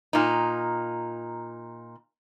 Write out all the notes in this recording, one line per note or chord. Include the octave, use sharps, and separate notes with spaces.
A#2 D#4